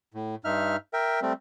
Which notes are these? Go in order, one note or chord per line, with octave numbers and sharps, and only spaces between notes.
A2
G2 D#4 E5 F6
A#4 E5 G5
G3 A3 C4